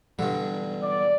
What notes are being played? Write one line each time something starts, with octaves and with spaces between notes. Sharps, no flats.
G2 B2 D3 E3 G3
D5